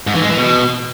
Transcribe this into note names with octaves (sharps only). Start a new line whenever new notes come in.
G#2
E3
G#3
E3
B2